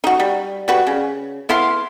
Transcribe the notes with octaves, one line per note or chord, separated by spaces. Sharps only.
D#4 F#4
G3
G3 F#4 B4
C#3
B3 E4 F5 C6